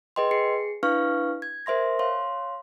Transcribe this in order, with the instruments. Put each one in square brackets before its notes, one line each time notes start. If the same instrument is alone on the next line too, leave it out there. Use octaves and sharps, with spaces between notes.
[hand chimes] G#4 B4 D#5 G5 C6
G#4 C7 C#7
D4 E4 B4 F5 C#6 F6
G#6
A#4 C5 E5 C6 A#6
C#5 F5 C6